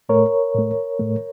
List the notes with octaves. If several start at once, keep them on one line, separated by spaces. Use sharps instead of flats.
A2 A3 A#4 C#5
A2 A3
A2 A3